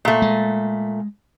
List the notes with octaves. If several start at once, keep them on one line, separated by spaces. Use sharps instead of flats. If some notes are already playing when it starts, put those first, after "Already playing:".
A#2 A3
G#3